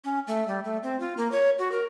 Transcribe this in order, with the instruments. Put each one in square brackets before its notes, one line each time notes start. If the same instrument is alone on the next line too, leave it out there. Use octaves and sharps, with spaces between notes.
[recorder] C#4
A3
G3
A3
C4
F4
A#3
C#5
F#4
A#4